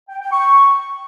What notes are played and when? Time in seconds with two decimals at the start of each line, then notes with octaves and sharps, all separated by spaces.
0.09 G5
0.20 G5
0.32 C#6